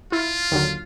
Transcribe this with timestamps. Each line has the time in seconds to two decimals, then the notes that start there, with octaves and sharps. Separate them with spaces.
0.12 E4 F4
0.52 D#2 D3 F#3